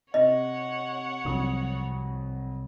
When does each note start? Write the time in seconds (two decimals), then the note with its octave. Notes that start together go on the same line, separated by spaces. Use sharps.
0.14 C3 C#5 D#5 F#5 A#6
1.25 C2 F2 F#3 D#6